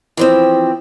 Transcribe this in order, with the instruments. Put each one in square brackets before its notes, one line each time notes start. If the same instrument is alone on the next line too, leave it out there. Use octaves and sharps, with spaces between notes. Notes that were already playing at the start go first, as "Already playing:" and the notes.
[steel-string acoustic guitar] E3 F3 C4